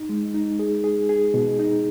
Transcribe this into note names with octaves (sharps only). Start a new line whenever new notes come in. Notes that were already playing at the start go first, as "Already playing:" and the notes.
Already playing: D#4
G#3
D#4
G#4
G#4
G#4
B2
D#4